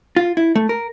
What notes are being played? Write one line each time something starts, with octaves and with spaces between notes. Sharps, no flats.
F4
E4
A3
A#4